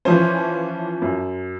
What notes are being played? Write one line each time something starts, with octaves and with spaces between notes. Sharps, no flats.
E3 F3 C#4 C5
F#2